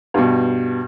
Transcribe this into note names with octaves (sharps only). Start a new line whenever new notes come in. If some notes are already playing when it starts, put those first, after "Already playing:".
G2 B2